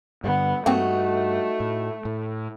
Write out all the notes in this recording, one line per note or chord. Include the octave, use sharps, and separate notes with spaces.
G2 D3 B3
G2 A3 A#3 C4 D#4 F#4
A2
A2